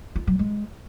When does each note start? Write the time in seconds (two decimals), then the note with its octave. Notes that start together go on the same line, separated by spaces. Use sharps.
0.16 F4
0.27 F#3
0.39 G#3